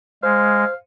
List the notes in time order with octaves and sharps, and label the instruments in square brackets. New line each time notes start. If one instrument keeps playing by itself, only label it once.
[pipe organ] G#3 [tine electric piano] C5 [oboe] F5